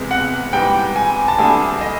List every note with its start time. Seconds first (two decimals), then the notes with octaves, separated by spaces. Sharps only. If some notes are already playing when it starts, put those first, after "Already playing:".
Already playing: E2 C3 E3 G#3
0.11 F#5
0.53 G#2 E3 G3 G5
0.96 G#5
1.28 A5
1.38 D2 D3 G3 G#5
1.81 D#5